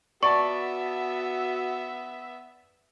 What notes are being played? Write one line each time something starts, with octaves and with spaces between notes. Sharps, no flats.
B3 F#4 D5 E5 A5 C#6